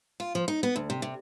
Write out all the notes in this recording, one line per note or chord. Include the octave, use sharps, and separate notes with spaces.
F4
F3
D#4
B3
D2
C3
C3